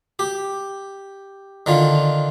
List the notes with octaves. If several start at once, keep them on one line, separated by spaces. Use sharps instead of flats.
G4
D3 D#3 F4